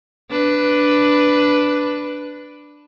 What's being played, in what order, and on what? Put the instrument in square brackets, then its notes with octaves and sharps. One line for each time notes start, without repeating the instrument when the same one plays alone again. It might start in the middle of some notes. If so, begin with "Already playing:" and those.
[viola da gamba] D4 B4